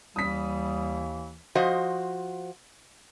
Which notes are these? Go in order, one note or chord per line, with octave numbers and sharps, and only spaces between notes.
D#2 E3 G3 D#6 B6
F3 F#4 C5 D#5